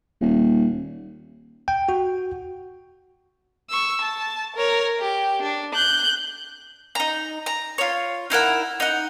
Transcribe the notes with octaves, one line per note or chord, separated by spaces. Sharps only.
D#1
G5
F#4
C#6 E6
A5
A#4 C#5
G4
D4
F#6 G6
D#4 A#5
A#5
F4 C#5
D#4 E4 A#4 F#5
D#4 F#5